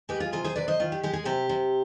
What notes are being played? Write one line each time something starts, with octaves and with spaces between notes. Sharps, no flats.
G#3 G4 B4
F4 G#4
C3 F4 G#4
G#4 C5
C3 B4 D5
C5 D#5
D#3 F4
G4
G#3 G4
G#4
C3 G4
C3